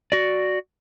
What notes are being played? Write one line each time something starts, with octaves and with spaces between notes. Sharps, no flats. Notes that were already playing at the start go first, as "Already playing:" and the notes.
F#4 D5